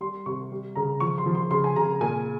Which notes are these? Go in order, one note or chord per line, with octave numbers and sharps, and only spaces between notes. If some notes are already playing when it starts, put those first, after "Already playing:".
G3 C6
C3 C#6
G3
C#3 A#5
F3 C#6
C6
F3
C6
C#3 C6
G#5
C#3 A#5
A#2 G#5